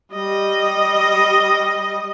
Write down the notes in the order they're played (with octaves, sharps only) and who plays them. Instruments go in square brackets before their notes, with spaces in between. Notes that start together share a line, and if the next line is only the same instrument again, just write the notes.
[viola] G3 D#5